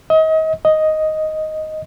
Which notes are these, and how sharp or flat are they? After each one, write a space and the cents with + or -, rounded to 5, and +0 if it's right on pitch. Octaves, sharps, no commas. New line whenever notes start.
D#5 +35
D#5 +5